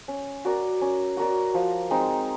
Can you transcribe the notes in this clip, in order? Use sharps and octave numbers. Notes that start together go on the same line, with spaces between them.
C#4
F#4 A#4 D5
C#4
F#4 A#4 D5
F3
G#3 C4 D#4